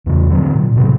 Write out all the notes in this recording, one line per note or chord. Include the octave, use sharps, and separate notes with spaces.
E2 C#3
D3 F3 F#3 C4
A#2
A2 C3 F#3